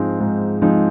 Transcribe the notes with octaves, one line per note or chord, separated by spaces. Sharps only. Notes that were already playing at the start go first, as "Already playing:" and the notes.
Already playing: G#2 F3 G#3 C4 D#4
G#2
F3 G#3 C4 D#4